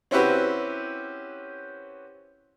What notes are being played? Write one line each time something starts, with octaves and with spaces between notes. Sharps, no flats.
C4 C#4 E4 F#4 G4 B4